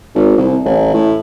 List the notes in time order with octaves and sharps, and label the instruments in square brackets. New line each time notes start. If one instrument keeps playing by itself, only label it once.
[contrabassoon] G#1
C2
A1
A2